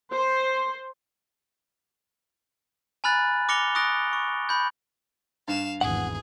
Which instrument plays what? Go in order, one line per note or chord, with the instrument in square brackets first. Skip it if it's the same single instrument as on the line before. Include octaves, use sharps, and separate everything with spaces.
[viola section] C5
[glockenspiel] G#5 A#5 B5 F6 F#6 A6
D6 F6 A#6 C#7 F7 G7
C#6 D#6 F#6 A6 A#6 D7
C#6
B5 G6
[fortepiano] G2 [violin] F5 E7
[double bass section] G#1 E2 E3 [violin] G#4 [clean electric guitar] F#5